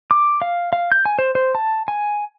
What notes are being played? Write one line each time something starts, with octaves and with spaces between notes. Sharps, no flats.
D6
F5
F5
G6
G#5
C5
C5
A5
G#5